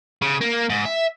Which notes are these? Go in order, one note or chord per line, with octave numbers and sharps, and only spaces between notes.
C#3
A#3
G#2
E5